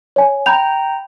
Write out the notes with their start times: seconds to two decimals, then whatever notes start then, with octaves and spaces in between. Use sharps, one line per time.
0.16 C#5 G#5
0.46 G5 A#5 B5 G6 F7